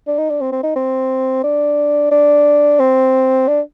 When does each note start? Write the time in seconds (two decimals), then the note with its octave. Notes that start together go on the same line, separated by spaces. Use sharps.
0.07 D4
0.18 D#4
0.30 D4
0.41 C4
0.52 C4
0.63 D#4
0.76 C4
1.44 D4
2.12 D4
2.80 C4
3.48 D4